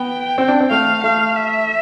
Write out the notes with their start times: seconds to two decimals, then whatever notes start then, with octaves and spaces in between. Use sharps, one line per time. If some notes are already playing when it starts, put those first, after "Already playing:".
Already playing: B3 G5
0.38 C4
0.48 D4
0.60 C4
0.71 A3 F5
1.04 A3 F5
1.36 E5